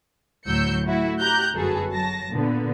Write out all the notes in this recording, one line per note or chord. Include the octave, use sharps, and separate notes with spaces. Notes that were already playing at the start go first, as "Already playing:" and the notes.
D2 A2 F#3 E6 G6 C#7
A3 E4 F#4
G4 A#5 F#6 G6
G1 F#2 F#4 G#4 A4 B4
F#3 A5 A#6
A#2 D3 B3